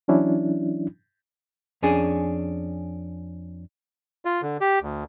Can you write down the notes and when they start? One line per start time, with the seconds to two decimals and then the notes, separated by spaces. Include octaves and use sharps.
0.08 E3 F#3 C#4 D4 E4
1.83 F2 C#4 D4 G#4
4.25 F4
4.42 D3
4.61 G4
4.82 D2